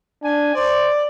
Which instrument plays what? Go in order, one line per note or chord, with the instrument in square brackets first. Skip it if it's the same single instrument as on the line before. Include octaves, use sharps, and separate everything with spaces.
[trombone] D4 [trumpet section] G#5
[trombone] C5 [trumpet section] D5